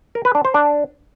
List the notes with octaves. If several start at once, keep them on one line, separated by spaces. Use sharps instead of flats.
A#4
B4
D4
C5
D4